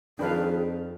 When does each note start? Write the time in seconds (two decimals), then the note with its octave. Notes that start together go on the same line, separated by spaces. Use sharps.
0.19 F2 D#3 F3 D4 G#4 B4 F5